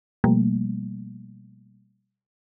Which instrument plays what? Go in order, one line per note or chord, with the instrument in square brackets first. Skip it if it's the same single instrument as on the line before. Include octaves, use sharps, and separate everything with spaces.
[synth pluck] B2 F3 G3 A3 A#3